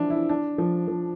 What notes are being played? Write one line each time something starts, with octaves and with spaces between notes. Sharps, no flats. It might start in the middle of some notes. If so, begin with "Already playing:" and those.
Already playing: E3 F3 D4 E4
E4
D4
F3
F3